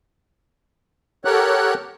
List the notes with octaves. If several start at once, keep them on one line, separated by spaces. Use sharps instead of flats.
G4 A4 A#4 C#5 F#5 F#6